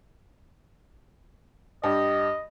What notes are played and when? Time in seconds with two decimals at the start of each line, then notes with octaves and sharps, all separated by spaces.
1.84 G2 G3 G4 D#5